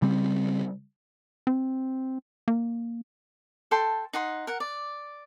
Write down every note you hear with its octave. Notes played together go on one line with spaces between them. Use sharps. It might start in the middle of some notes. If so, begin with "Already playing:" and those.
C#3 G3 C4
C4
A#3
A4 G5 A5 C6
D#4 F#5 C6
A#4 F#5
D5